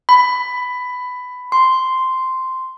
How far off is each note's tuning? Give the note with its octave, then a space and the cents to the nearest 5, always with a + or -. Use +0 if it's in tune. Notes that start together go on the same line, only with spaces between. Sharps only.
B5 +10
C6 -5